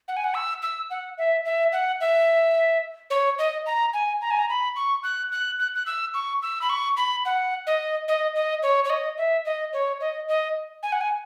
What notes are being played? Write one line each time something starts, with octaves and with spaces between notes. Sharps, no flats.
F#5
G#5
F#5
E6
E6
F#5
E5
E5
F#5
E5
C#5
D#5
A#5
G#5
A#5
G#5
A#5
B5
C#6
F#6
F#6
F#6
F#6
E6
C#6
E6
B5
C#6
B5
F#5
D#5
D#5
D#5
C#5
C#5
D#5
E5
D#5
C#5
D#5
D#5
G#5
F#5
G#5